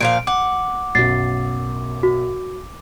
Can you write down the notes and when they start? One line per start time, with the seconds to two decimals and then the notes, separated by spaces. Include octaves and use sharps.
0.01 A#2 F3 F5 D7
0.27 F#5 D6
0.95 B1 F#2 A6 C7
2.03 F#4